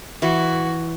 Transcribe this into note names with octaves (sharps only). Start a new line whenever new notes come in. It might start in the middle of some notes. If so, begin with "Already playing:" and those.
E3 F#4